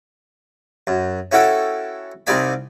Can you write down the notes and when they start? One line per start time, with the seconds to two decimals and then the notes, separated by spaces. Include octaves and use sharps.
0.87 F#2
1.32 C#4 E4 F#4 A4 G5
2.27 C2 C3 D#4 D5 G#5 B5